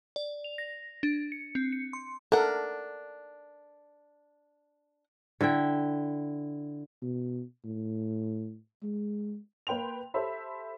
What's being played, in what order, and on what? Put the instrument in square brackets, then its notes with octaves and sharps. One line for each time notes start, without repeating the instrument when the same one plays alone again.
[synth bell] D5
F7
A#6
D4
C#7
C4
C#7
C6
[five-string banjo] D4 F#5 [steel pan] A4 A#4
[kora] D3 E4 E5 G5
[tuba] B2
A2
G#3
[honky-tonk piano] A#3 B4 G5 C6 F7
G4 A4 C5 E5 B5